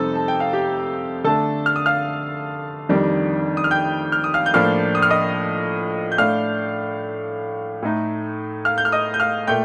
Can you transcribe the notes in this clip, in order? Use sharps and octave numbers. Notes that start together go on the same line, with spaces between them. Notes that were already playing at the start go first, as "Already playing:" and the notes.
Already playing: F2 C3 G3 C4 D#4 A4 A5
A5
G5
F5
G4 G5
D3 A3 D4 A4 A5
F6
D#6
F5 F6
F2 D#3 G3 D4
D#6
F6
G5 G6
F6
D#6
F5 F6
G6
A2 F3 A#3 D4 F5 F6
D#6
F6
D#5 D#6
G6
A2 A3 D4 F5 F6
A2 A3 D#4
F5 F6
G6
F6
D#5 D#6
G6
F5 F6
A#2 A3 G5 G6